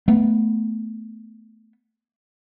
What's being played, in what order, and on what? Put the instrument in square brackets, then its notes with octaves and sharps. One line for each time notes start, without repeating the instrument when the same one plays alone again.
[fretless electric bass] A3 B3